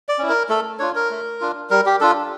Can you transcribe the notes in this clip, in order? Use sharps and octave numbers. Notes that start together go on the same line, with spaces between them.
D5
C#4 E4
A#4
A3 A4
D4 F4 C#5
A#4
A3
D4 F4
G3 A#4
G4
D4 F4 A4